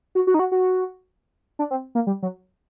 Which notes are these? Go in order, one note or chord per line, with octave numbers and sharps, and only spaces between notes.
F#4
F#4
D#4
F#4
F#4
D4
C4
A#3
G3
F#3